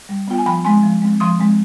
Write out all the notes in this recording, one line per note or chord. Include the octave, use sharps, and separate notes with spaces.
G3
B3 F4 G5
G#5
F3 G5 B5
G#3 C4 G#5 C6
F3
G#3 C4
F3 C6 D#6
G#3 C4